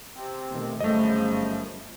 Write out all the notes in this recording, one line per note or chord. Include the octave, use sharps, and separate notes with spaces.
C3 C4
B2 D#3 A3
G1 F#2 C#3 F3 G3 A3 D#5